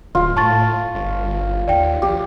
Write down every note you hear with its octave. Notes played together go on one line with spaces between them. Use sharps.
D1 F4
A2 A5 C#6 A6
G1
D#2 D5 G5
A#1 G4